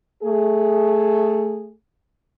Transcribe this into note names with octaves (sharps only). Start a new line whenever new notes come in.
A3 G#4